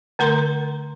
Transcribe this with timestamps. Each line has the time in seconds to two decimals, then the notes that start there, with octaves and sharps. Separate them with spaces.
0.19 D3 A3 A#4 A#5 C6